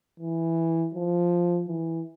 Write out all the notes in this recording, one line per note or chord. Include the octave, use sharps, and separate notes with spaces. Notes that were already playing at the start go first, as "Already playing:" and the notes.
E3
F3
E3